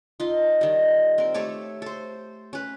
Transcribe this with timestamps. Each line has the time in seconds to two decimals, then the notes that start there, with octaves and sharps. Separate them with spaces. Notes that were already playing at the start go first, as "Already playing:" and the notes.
0.20 D#4 F4
0.61 D#3 G3
1.18 C4 A#4
1.34 A3 G4 A4 C#5
1.82 A4 C5
2.53 C#4 B4